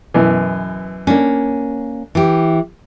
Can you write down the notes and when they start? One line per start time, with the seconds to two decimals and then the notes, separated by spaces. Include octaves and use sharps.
0.14 F#2 B2 E3
1.07 A#3 C#4 D4
2.15 E3 G4